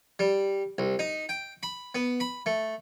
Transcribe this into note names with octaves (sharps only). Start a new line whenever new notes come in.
G3
C2
D#4
G5
B5
B3
B5
A3